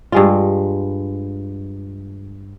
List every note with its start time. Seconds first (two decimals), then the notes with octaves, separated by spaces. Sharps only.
0.12 G2 G#3 F4